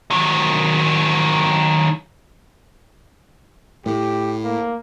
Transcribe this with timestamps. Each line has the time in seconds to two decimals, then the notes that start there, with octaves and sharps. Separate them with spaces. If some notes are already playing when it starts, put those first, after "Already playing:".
0.10 D#3 F#3
3.86 A2 G4
4.44 A#3